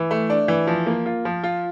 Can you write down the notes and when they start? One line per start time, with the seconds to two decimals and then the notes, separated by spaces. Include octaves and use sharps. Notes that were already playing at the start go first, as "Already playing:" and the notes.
Already playing: E3
0.11 A3
0.30 D4
0.48 E3
0.67 F3
0.86 A#3
1.06 F4
1.25 F3
1.44 F4